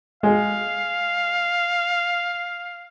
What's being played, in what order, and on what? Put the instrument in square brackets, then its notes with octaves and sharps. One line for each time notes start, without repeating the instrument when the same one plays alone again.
[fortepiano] G#3 [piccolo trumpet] F5